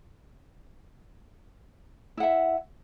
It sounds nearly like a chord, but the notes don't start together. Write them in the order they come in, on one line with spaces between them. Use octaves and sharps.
E4 F#5 E5